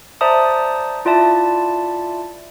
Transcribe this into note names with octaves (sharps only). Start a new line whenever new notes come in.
C5 D5 E5 A5 A#5 D#6
E4 F4 D5 E5 A5